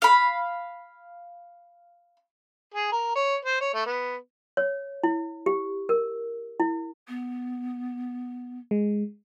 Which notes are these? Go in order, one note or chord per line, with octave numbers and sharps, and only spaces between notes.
F5 B5
G#4
A#4
C#5
C5
C#5
A3
B3
C#5
E4
G4
A#4
E4
B3
G#3